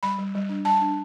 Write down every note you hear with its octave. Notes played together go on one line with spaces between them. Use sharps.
G3 B5
G3
G3
D4
G3 A5
D4